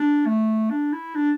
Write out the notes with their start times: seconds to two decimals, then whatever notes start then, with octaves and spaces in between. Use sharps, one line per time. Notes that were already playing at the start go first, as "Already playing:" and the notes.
Already playing: D4
0.26 A3
0.70 D4
0.93 E4
1.15 D4